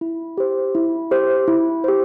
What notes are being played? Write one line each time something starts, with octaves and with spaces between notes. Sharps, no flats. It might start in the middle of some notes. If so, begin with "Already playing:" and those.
E4
G4 C5
E4
G4 C5
E4
G4 C5